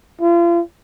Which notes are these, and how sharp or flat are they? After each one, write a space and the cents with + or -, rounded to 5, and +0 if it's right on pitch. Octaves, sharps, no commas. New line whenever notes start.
F4 -35